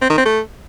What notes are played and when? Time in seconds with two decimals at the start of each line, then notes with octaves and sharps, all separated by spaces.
0.01 C4
0.09 D#3
0.17 C4
0.26 A3